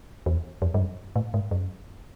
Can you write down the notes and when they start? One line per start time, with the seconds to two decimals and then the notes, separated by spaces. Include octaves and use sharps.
0.26 E2
0.62 F2
0.74 G2
0.80 F#2
1.16 A2
1.34 G#2
1.51 F#2